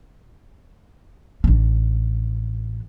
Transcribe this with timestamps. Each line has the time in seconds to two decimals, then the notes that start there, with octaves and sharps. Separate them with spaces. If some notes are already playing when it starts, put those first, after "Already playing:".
1.44 A1 D4